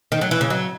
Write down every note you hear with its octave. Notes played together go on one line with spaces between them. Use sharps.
D#3
F#3
E3
C#3
F#3